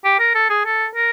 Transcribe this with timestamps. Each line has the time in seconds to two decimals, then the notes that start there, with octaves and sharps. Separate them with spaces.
0.04 G4
0.19 A#4
0.35 A4
0.50 G#4
0.65 A4
0.95 A#4